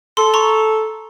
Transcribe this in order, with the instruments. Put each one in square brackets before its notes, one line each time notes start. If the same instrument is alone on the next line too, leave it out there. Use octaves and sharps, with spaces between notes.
[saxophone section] A4 [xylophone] C6
[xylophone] A#5 C6 C#6